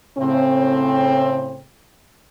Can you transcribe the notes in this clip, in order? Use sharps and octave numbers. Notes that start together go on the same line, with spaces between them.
A2 C#3 C4